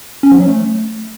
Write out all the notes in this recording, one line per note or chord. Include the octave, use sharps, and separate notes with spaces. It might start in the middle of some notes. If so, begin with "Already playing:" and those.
C#4
F3
F#3
A3